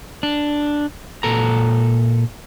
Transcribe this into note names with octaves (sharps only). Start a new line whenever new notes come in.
D4
A#2 A4 A#5